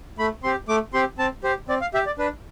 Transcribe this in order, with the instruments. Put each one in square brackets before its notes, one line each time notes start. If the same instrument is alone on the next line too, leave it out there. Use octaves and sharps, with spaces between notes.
[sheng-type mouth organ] A3 B5
C4 C6
G4
A3 D6
C4 G4 C6
C4 A5
G4 C5
C4 D5
F5
G4 E5
D5
D4 B4